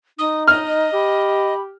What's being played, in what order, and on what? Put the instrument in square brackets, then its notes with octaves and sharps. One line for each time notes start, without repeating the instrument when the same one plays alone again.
[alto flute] D#4 [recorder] D#6
[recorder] D#5 [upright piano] F6
[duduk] G4 [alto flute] B5